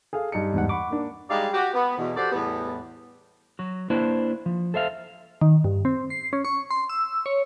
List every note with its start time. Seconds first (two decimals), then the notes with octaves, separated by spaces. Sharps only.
0.13 G#4 A4 F5
0.32 G2 D#4 C#7
0.53 E2 G#2 F#5
0.69 F#5 B5 C#6 D6
0.90 A#3 D4
1.29 G3 G#3 D#4 G4 D5 F5
1.53 F#4 G4
1.74 B3
1.97 E2 B2
2.16 F#4 G4 A4 C5 D5
2.32 E2 A2 G3 B3
3.59 F#3 F#4
3.90 A#3 D4 E4 B4 C5
4.46 F3
4.74 A4 C5 E5 F5
5.41 D#3
5.64 G2
5.85 C4
6.10 C7
6.33 C#4
6.45 C#6
6.71 C6
6.89 E6
7.26 C#5